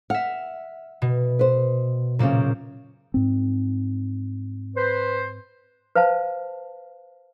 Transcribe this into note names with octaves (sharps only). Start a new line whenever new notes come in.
E5 F#5 F6
B2
B4 C5
F#2 A#2 C#3 A#3 C5
G#2 C4
B4 C5
B4 C5 F5 A5